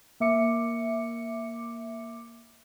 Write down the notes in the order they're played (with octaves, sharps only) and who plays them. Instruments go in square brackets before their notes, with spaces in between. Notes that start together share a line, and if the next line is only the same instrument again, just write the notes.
[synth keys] A#3 E5 D6 C#7